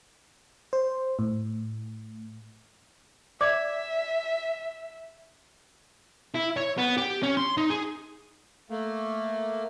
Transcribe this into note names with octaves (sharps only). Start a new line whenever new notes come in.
C5
A2
D5 E5 D6 G#6
E4
C#5
B3
G4
C#4
C6
D#4
G#4
A3 A#3